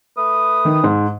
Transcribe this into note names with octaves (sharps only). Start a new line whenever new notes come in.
A3 B4 D#6
D#3
G#2